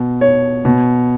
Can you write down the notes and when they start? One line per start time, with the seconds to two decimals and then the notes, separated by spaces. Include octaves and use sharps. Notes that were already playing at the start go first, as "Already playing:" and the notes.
Already playing: B2
0.21 C#5
0.65 B2